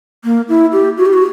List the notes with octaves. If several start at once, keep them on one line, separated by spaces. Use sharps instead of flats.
A#3
E4
G4
F#4
G4
F#4